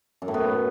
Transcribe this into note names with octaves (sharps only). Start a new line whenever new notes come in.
F#2
A2
B3